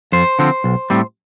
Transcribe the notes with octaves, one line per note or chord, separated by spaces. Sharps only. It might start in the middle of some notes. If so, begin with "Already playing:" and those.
F2 C5
D3 F3 C4
B1
A2 G3 C4